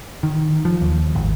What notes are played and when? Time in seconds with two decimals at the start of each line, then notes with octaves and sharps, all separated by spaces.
0.23 D#3
0.65 F3
0.81 D#2
1.15 G#1